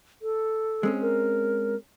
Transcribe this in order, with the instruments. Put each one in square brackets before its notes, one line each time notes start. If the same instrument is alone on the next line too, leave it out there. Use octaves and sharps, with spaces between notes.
[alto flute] A4
[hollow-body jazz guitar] G#3 C4 C#4
[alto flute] A#4